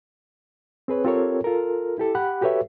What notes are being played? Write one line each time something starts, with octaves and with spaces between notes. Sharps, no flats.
C4 G#4 B4 C#5
C4 F4 G4 A4 A#4 C#5
F4 A4 A#4
E4 G4 A4
G4 F#5 B5 F#6
F#4 G4 A4 B4 C#5 E5